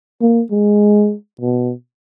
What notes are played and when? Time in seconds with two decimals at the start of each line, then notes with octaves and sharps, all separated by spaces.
0.21 A#3
0.51 G#3
1.41 B2